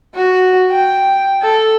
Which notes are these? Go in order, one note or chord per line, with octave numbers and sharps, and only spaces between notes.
F#4
G5
A4